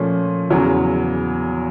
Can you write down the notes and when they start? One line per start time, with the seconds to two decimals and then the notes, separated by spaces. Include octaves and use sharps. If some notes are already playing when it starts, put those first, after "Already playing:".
Already playing: A#2 F3 A3 C#4
0.50 E2 C#3 F#3